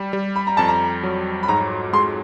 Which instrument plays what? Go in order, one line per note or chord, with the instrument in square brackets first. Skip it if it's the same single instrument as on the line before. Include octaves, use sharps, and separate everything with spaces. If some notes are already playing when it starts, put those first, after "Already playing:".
Already playing: [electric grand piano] G3
G3
[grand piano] B5
A#5
[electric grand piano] F2 [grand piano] A5
[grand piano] A#5
[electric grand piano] F#3
[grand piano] B5
[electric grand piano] G#2 [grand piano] A#5
[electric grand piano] G#3 [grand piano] C6